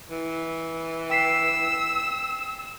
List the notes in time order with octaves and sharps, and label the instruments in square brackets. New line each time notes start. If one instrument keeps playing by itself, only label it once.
[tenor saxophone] E3
[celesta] G5 B6 C7 [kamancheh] E6